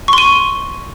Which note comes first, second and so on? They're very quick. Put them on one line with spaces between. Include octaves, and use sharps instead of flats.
C#6 C6 D#7